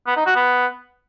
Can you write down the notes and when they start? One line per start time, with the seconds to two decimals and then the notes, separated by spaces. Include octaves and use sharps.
0.07 B3
0.16 D#4
0.26 F#4
0.36 B3